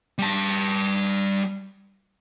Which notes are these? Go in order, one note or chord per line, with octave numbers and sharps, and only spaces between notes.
G3 A5